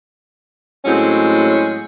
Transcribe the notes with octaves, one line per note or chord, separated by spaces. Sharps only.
A2 F#3 G#3 C4 C#4